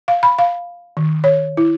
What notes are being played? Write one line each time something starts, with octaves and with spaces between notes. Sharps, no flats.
F5
B5
F5
D#3
C#5
E4